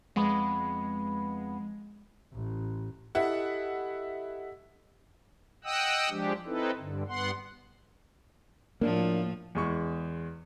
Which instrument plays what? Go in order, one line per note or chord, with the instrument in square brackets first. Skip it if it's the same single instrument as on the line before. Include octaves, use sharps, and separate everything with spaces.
[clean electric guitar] F2 B3 B4 [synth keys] G#3
[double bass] A1
[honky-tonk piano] E4 F#5 [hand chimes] G4 A4 D#5
[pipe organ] D#5 F#5 G5 D#6 E6 F#6
F3 G#3 D4 G4
C4 D#4 E4 A4 B4
G2 D3
G2 B3 F#5 C6
[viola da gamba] A2 F3 [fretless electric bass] A#3 D4
[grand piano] E2 G#3 C#6